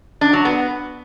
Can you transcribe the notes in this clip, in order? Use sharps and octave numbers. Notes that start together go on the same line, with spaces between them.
D4
F#3
B3